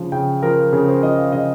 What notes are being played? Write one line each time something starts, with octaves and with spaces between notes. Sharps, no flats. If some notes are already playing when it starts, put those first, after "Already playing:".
Already playing: C#3 F3
C#3 G5
F3 A#4
C#3 G#4
C5
F3 D#5
F5
C#3 D#5